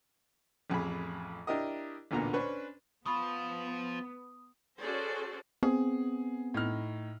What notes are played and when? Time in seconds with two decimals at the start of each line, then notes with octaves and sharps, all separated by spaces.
0.70 A1 F2 G#4 B5
1.47 D4 E4 G4 A#4 D#5
2.11 A1 D2 A#2 D3 B3 A#5
2.33 C#4 D4 B4 C5 C#6
3.06 F3 B3 F4 B5 C#6 D#6
4.80 C#4 F#4 G#4 A4 C5 D5
5.63 B3 C4 G#4
6.54 A2 D#4 F6